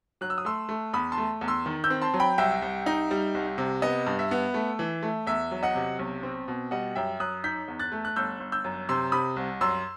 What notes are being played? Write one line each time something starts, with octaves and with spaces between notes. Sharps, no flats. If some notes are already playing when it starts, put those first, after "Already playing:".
F#3 F#6
E6
D#6
A3 C6 E6
A3
E2 B5 D#6
A5 C6
A3
E2
C6 E6
D#3
E6 G6
C4
A5 C6
F#3
G5 B5
C2 E5 G5
C2
D#4
G3
C2
C3
B3 D#5
G2
E5
B3
A3
E3
A3
E2 E5
F#3
D#5 F#5
C3
B1
C4
B2
G3 D#5 F#5
F#2 E5 G5
F#2 D#6 F#6
D#4 G6 B6
E2
F#6 A6
A3
F#6
G1 E6 G6
G1
E6 G6
F#2
C3 C6 E6
C3 B5 D#6
C2
F#2 C6 E6